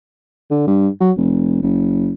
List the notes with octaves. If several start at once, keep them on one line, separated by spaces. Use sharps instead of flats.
D3
G2
F#3
F1
F#1